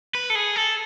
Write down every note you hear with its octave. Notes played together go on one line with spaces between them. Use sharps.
B4
A4
G#4
A4